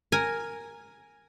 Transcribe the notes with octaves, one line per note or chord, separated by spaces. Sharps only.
A#4 G#5